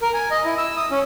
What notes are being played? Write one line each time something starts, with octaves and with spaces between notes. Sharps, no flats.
A#4
G#5
D#5
E4
E6
D#6
C#4